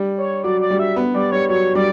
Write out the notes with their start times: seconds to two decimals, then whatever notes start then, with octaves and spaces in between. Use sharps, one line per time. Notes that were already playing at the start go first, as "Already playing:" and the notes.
Already playing: G3
0.18 C#5
0.44 F#3 D5
0.61 D5
0.70 G3
0.79 E5
0.96 B3
1.14 G3 D5
1.32 G3 C#5
1.49 F#3 C#5
1.75 G3 D5